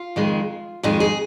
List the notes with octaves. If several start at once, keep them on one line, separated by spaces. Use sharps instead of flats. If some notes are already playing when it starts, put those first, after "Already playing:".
Already playing: F4
F2 D#3 G#3
F2 D#3 G#3 F4
G#4